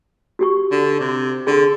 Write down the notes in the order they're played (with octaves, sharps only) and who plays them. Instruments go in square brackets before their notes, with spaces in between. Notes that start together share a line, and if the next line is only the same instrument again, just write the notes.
[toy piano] F#4 G4 C#6
[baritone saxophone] D3
C3
[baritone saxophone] D3 [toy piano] G#4 C6